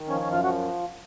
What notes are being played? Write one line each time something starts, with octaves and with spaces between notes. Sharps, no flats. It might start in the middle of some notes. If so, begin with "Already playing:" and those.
Already playing: D#3
F3 C#4 C#5
C#4 C#5
F#2
F4 F5
F3 F#4 F#5